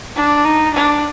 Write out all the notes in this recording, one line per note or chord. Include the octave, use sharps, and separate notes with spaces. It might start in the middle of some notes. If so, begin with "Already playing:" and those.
D4
D#4
D4